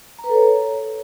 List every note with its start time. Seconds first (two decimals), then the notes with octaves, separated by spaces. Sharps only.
0.19 A#5
0.24 B4
0.29 A4
0.35 C#5